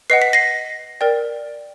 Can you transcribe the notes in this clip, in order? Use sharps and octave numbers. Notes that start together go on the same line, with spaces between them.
B4 D#5 F#5 C7
B6
A#6 C7
A#4 D5 G5